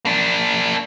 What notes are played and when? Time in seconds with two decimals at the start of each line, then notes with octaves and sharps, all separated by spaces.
0.05 A#3 D4